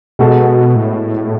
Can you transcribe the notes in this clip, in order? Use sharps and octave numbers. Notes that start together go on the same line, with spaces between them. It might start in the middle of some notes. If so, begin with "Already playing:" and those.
B2 G#3 B3 F#4 A4
A2